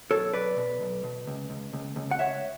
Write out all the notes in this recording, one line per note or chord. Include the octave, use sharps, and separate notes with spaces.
B1 A4 C#5
B1 B4 D5
B2
B1
B2
C#2
C#2
C#2
C#2
F#5
C#2 C#5 E5